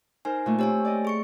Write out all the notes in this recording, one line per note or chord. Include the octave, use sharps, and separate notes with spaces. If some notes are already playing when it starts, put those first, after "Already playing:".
D#4 A#4 C5 G#5
A#2 A3 D#4
C4 G4 C#5 G#5 E6
D5 D#5
G#4 C#6 C#7